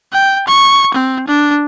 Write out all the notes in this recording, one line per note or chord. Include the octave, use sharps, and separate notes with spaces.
G5
C#6
C4
D4